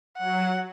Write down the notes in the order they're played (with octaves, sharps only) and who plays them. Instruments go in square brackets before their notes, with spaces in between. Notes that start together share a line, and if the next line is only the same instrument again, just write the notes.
[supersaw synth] F#3 [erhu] F#5